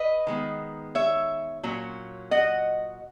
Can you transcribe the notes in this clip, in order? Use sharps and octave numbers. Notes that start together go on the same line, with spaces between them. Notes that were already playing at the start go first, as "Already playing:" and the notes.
Already playing: B4 D#5
D#3 G#3 B3
C#5 E5
A#2 F#3 C#4
D#5 F#5